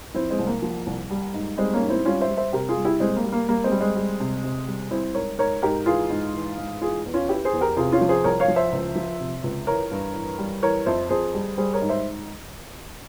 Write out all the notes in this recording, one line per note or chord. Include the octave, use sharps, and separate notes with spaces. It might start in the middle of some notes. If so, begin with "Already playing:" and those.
F3 C4 E4
G#3 C4
C2
A#3
F3
C2
G3
G#2
G3 G#3 C4
A#3 C#4
G#2
C4 E4
G3 C#4 F4
C5 E5
G3
C5 E5
C3 G4 A#4
F4 G#4
G3
E4 G4
G3 G#3 C4
A#3
G3
A#3
G3 A#3
G#3 C4
G3
G#3 C4
G3
C3
C3
G3
G3 C4 E4
G#2 A#4 C#5
G#2 A#4 C#5
G#2 G4 A#4
E3 F4 G#4
G#2
E3
G#2
E3 F4 G#4
E2
C#4 F4
E3 E4 G4
G#4 C5
E2
G4 A#4
C3 F4 G#4
C#4 F4
F3
G#4 C5
C2 A#4 C#5
C#5 F5
F3
C5 E5
C#2
F3
C3
C#2
E3 A#4 C#5
G2
E3
G3
E3 A#4 C#5
F2 C5 E5
F2 G#4 C5
G3
G3 G#4 C5
A#4 C#5
G#2
C5 E5